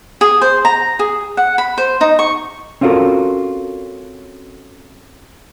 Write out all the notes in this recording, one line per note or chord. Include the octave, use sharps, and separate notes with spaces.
G#4
C5
A#5
G#4
F#5
B5
C5
D#4
C#6
C4 C#4 F4 F#4 A4 A#4